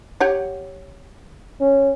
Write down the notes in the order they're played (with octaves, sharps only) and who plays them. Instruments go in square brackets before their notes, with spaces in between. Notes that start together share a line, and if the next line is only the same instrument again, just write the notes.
[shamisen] G4 C#5 F#5
[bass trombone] C#4